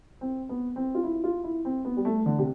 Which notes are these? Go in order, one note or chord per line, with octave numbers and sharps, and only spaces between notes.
C4
B3
C4
F4
E4
F4
E4
C4
B3
G3
A3
D3
C3